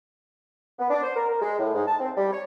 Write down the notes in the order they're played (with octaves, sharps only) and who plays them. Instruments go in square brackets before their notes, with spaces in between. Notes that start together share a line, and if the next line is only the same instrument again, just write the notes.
[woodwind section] B3
D4
C5
A#4
A#4
G#3
A2
G#2
A5
C4
G3
C#5